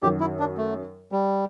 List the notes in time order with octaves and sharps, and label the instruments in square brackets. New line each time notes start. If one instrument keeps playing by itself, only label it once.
[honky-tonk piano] F#2 D#3 F#3 [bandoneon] G4
[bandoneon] E4
D4
A3
G3